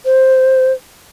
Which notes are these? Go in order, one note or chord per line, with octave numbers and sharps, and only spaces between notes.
C5